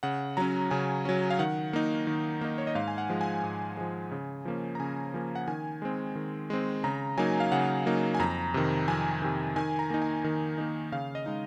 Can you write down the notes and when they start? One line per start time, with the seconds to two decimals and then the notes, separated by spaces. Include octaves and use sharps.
0.03 C#3 F#5
0.37 F#3 C#4 A#5
0.71 C#3 G#5
1.05 F#3 C#4
1.30 F5
1.39 D#3 F#5
1.73 A#3 D#4
2.07 D#3
2.41 A#3 D#4
2.58 C#5
2.67 D#5
2.75 G#2 F5
2.88 G#5
2.98 F#5
3.10 F3 G#3
3.21 G#5
3.44 G#2
3.77 F3 G#3
4.12 C#3
4.45 F3 A#3 C#4
4.75 A#5
4.80 C#3 G#5
5.14 F3 A#3 C#4
5.35 F#5
5.48 D#3 G#5
5.82 G#3 C4
6.15 D#3
6.50 G#3 C4
6.84 C#3 A#5
7.18 F#3 A#3 D#4 G#5
7.40 F5
7.52 C#3 F#5
7.86 F#3 A#3 D#4
8.15 G#5
8.19 F2 A#5
8.54 C3 D#3
8.88 F2 G#5
9.22 C3 D#3
9.56 D#3 G#5
9.79 A#5
9.90 A#3 D#4
10.02 G#5
10.24 D#3
10.58 A#3 D#4
10.92 C#3 F5
11.15 D#5
11.26 G#3 D#4